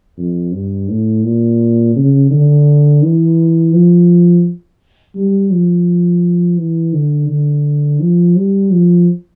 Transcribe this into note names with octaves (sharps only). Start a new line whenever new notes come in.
F2
G2
A2
A#2
C#3
D3
E3
F3
G3
F3
E3
D3
D3
F3
G3
F3